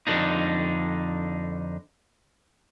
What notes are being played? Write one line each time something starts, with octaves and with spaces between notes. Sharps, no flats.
F2 G#2 D3 D4 D#4